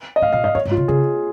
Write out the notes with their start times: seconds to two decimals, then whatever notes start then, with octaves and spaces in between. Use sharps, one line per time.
0.16 D#5
0.22 G#2 F5
0.33 A#2 F5
0.44 G#2 D#5
0.55 F2 C#5
0.65 G#2
0.71 F4
0.77 C#3
0.88 C#3 G#4